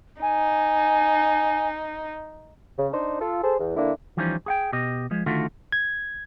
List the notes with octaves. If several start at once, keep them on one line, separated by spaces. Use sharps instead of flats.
D#4 G#5
C#3
D4 D#4 C5
F4 A4
G#4 A4 C5
E2
D3 A#3 D4 E4
E3 F3 G3 C#4 D#4 C5
G#4 F#5 G5
B2 G4 D#5
F3 G#3
D3 D#3 A3 F4 F#4
G#6